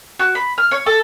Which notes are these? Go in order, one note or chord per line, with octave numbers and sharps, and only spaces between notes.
F#4
B5
F6
C#5
A4